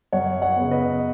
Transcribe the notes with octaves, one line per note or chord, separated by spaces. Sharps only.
F#2 C#5 F#5
C#5 F#5
C#3 B3
B4 D#5